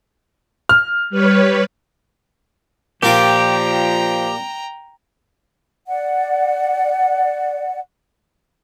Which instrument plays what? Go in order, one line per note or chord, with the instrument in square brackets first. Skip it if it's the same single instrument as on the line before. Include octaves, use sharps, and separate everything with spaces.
[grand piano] F6
[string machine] G3 B4 C#5
[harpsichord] A#2 F4 D6 [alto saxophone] F3 [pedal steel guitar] G4 [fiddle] G5 A#5
[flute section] D5 F#5